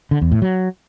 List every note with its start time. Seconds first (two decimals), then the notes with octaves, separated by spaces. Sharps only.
0.11 D3
0.21 E2
0.32 A2
0.42 F#3